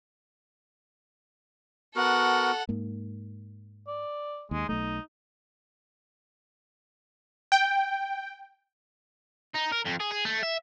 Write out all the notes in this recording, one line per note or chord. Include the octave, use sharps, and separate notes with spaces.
B3 F#4 A4 A#4 F#5
G#2 A#3
D5
D#2 G#3
B1 A3 D#4
G5
D#4
A#4
F2
G#4
G#4
A3
E5